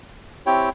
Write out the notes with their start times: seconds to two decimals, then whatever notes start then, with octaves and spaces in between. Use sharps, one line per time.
0.46 C4 E4 G4 C#5 G5